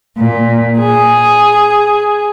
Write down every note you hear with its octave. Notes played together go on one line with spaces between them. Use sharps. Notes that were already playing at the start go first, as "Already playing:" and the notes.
A#2
G#4